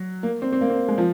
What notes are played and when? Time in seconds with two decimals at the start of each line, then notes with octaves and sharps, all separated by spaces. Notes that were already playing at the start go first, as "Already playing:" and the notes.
Already playing: F#3
0.23 A#3
0.42 C4
0.53 C4
0.61 A#3
0.70 C4
0.88 G#3
0.98 F3